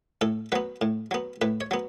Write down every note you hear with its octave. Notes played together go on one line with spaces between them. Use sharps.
A2 A4
F#3 B3 B4
A2
F#3 B3
A2 B4
C#5
F#3 B3